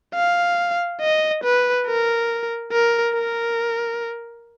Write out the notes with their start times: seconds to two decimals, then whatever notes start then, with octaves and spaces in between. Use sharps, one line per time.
0.15 F5
1.01 D#5
1.43 B4
1.86 A#4
2.72 A#4
3.15 A#4